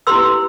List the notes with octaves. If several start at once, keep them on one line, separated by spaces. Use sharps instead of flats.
E4 G4 B4 C6 E6